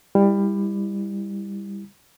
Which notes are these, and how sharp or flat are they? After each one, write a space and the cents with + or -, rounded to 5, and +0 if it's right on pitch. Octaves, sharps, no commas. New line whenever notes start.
G3 +25 E4 +0